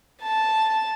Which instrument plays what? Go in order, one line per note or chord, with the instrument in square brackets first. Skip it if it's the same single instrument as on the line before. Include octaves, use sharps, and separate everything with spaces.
[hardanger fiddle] A5